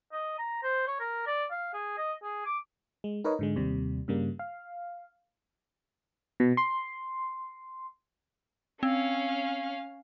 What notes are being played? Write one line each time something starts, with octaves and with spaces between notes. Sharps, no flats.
D#5
A#5
C5
C#5
A#4
D5
F5
G#4
D#5
G#4
D6
G#3
D#4 A#4 B4 C#5 D#5
G#2 D3 G#3
D#2 C3 G3
G2 C#3 G3 A#3
F5
B2
C6
C4 C#4 F5